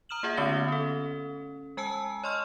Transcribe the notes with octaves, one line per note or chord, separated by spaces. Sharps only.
A#5 D#6 F6 E7 F#7
A#3 F4 G#4 E5 F#5
D3 A3 B3 C#4 A#6 G7
C#4 A4
G#3 G#5 A5 E6
C#5 D#5 C6 C#6 F6